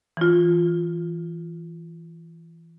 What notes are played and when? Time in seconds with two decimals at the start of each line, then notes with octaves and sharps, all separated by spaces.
0.17 E3 F4